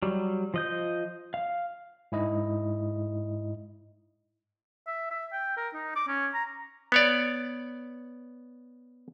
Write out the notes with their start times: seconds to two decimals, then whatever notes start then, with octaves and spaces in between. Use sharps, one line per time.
0.02 F#3 G3
0.54 F3 D#5 G6
1.34 F5
2.12 G#2 E4 D#5
4.87 E5
5.11 E5
5.33 G5
5.57 A#4
5.74 D#4
5.96 D6
6.08 C#4
6.34 A#5
6.92 B3 C#5 D5